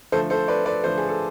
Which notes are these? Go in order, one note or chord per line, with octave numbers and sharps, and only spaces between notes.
D3 F3 A3 A4 C5
A4 C5
B4 D5
B4 D5
D3 F3 A3 A4 C5
G#4
A4